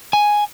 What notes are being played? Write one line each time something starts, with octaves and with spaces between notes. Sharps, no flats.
G#5